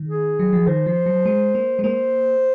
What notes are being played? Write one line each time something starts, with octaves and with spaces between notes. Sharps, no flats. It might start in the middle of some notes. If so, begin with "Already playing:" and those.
Already playing: D#3
G#4
F#3
F3
D#3 C5
F3
F#3
G#3
A#3
G#3
A#3 C5